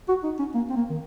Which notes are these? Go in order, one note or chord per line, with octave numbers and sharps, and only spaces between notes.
F#4
D#4
C#4
A#3
C4
A#3
D#3